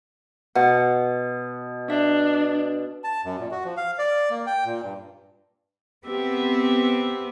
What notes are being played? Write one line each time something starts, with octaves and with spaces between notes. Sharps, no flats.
B2 F#5
D4 E5
A5
F#2
A#2
F#4
F3
F5
D5
A#3
G5
A#2
G2
B3 C4 G4 E5